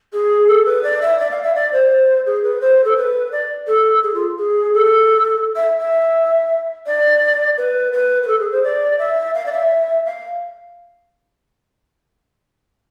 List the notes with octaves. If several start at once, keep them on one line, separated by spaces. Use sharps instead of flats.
G#4
A4
B4
D5
E5
D5
F5
E5
D5
C5
G#4
B4
C5
A4
B4
D5
A4
G#4
F4
G#4
A4
E5
E5
D5
B4
B4
B4
A4
G#4
C5
D5
E5
F5
D5
E5
F5